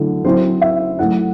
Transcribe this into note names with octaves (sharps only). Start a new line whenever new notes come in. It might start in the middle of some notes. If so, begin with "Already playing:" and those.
Already playing: D3 F#3 A3 E4
F#3 C4 E4 C5
E5
F#3 A3 E4 F#5